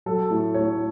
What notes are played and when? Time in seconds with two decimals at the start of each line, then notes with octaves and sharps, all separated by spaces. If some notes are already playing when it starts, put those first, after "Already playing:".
0.06 F#3 A4
0.31 A2
0.54 A2 C#5